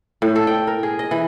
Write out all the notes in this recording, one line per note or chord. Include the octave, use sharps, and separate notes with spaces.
A2
A4
G5
A#4
G#4
D#5
E3